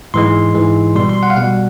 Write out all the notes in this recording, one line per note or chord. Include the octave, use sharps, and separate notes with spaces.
G#2 E3 G#3 C6
G#2 E3 G#3
B2 G3 C6
C6
F#5
F5
B2 G3 F#5